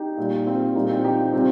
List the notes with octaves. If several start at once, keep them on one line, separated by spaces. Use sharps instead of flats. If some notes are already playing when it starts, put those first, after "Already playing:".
Already playing: D#4 G4
A#2 G3
C4 F4
A#2 G3 A#3 D#4
C4 F4
D#4 G4
C3 G3 C4 F4